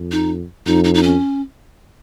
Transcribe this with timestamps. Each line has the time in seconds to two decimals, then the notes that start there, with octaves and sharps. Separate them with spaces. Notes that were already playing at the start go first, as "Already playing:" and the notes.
Already playing: F2
0.12 D#4
0.66 F2 D#4
0.84 D#4
0.94 D#4
1.03 C#4